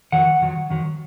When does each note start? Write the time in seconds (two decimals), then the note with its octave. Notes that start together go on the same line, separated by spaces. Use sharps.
0.12 F2 D#3 F#3 F#5
0.41 F2 D#3 F#3
0.70 F2 D#3 F#3